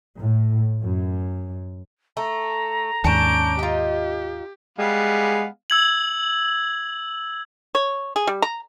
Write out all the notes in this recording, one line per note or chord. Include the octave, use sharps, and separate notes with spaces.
A2
F#2
A3 A#5
D#2 G#2 C#4 D4 A5 G6 D7
D#4 F4 G4
G3 G#3 B3 F5
E6 G#6 F#7
C#5
G#4
G3
A#5